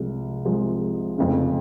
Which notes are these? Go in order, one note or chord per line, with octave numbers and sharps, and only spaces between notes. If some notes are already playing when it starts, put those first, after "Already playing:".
Already playing: C2 C3 F3 G#3
C2 C3 F3 G#3
F1 F2 C#3